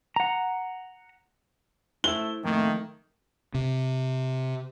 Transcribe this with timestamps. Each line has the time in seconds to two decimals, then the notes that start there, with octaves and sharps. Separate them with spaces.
0.16 F#5 A#5
2.04 A3 E4 C5 E5 G7
2.44 F2 A2 D#3 A3 A#3
3.54 C3